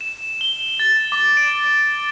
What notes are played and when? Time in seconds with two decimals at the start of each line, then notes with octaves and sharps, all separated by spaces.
0.01 E7
0.41 G7
0.80 A6
1.12 D6
1.37 D7